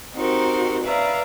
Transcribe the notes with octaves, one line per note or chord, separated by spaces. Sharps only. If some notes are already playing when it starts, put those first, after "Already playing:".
C4 D#4 F#4 G4 A#4 C5
B4 D5 E5 F5 A#5